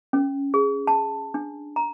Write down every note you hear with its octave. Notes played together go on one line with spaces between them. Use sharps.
C#4
G#4
A5
D4
A#5